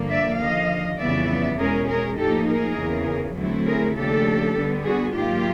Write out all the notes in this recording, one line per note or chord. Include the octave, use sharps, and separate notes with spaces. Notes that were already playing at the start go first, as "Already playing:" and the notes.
Already playing: G2 D3 F3 A#3
D5 E5
D#2 D3 F3 D#5 F5
F2 C#3 E3 G3 B3 D5 E5
E2 B2 G#3 C#4 G#4 A#4
G#4 A#4
A2 F3 A#3 D#4 G4 A4
G#4 A#4
E2 C#3 E3
D3 F#3 A3 C4 E4
G#4 A#4
D#2 C#3 F3 A3 D4 G4 A4
D3 G3 B3 D4
F#4 G#4
G#2 D#3 F#3 A#3 F4 G4